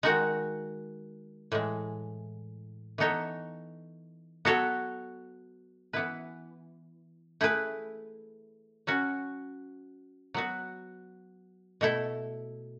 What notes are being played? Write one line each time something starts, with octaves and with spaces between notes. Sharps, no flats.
D#3 G#3 D#4 F#4
A2 E3 G#3
E3 B3 D#4 A4 C#5
F#3 B3 F#4 A4 C#5
E3 B3 E4 B4
A3 E4 G#4 B4
F#3 C#4 F#4
F#3 B3 F#4
B2 A3 E4 A4